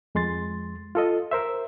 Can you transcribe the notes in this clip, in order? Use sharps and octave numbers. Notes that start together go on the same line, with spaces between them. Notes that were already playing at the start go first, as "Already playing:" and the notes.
F2 G#3 C6 A6
F4 A4 D#5
A#4 C5 E5